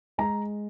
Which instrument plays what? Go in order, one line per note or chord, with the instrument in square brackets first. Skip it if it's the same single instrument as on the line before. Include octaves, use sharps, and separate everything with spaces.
[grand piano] G#3 A#5